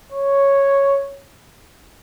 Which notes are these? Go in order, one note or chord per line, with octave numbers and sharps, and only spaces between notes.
C#5